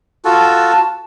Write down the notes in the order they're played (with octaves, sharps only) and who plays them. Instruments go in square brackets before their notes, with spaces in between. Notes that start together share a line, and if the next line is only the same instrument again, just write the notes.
[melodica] F4 F#4 A4 [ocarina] A5